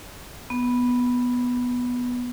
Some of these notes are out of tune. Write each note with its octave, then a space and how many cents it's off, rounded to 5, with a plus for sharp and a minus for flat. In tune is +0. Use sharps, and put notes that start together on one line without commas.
B3 -5